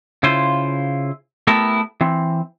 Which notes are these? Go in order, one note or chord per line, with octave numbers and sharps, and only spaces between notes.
C#3 E4 F4 C5
A3 B3 E4 G4 A4 A#4
E3 C4